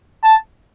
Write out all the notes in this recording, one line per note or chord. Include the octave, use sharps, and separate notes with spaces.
A5